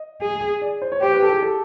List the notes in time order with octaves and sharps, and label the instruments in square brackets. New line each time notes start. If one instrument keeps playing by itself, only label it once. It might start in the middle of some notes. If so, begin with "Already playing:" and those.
Already playing: [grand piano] D#5
[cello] G#4
[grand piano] D5
C5
C#5
[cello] G4 [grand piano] C5
[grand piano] B4
A4
G#4
A4